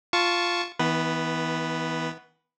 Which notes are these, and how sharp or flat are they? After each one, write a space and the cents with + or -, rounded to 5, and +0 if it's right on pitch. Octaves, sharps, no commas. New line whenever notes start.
F4 +0 A5 -5 C#6 +0
E3 -35 B3 +0 B4 +0